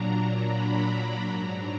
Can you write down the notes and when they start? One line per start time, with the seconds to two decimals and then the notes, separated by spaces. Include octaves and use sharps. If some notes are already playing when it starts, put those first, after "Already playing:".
Already playing: A#2 F#3 D4 A#5
0.45 B5
1.26 G#2 F#3 D4 A#5